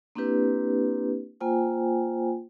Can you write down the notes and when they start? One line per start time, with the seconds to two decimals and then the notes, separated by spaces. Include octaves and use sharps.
0.15 A#3 C4 D4 E4 G4 B4
1.41 A#3 F4 C5 G5 G#5